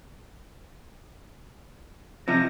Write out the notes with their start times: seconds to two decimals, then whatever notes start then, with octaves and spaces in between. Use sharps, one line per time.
2.28 C3 F3 A#6